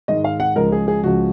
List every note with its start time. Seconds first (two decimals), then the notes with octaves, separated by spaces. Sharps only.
0.08 G#2 D#3 G#3 D#5
0.24 F5
0.40 F#5
0.55 C#2 C#3 F3 G#3 A#4
0.72 G#4
0.88 G#4
1.03 C#2 C#3 F3 G#3 F#4